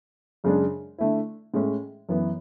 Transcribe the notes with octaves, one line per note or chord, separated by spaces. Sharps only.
F#2 C#3 G#3 D4
D3 A3 E4
A2 G#3 C#4
F#2 E3 B3